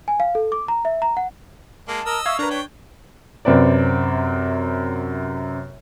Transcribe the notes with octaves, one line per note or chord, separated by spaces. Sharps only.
G#5
F5
A4
D6
A#5
E5
A#5
F#5
G#3 A#3 A5
A#4 D#5 E6
E5 F5 C#6 G#6
D4 A#4 B4 A#5
C#5 G5
F#2 C3 C4 B4 D5